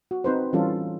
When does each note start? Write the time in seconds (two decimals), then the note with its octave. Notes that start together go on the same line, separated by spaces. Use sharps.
0.11 F#4
0.24 C4 D#4 B4 C5
0.53 E3 G3 C#4 F4 A4